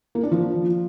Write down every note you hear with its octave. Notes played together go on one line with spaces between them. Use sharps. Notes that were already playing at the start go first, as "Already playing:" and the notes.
A#3
D4
F3